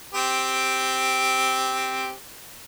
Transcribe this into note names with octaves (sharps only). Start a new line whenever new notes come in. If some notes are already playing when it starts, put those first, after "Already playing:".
C4 G4